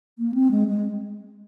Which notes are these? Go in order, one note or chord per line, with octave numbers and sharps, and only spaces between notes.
A#3
C4
G#3
G#3